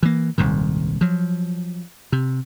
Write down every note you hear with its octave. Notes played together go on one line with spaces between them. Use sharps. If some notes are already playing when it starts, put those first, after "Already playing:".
E3 A#3
D#1 C2 G#2 D#3
F3 F#3
C3